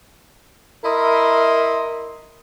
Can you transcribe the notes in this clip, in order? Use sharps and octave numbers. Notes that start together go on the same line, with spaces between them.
E4 A#4 D#5 E5 C6